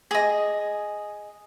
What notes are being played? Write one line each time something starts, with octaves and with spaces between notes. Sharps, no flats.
G#4 D#5